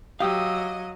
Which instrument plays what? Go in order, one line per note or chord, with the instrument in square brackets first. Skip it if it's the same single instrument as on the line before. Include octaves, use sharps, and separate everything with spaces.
[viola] F#3 D#5 [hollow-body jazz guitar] G4 [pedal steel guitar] F5 D#6 E6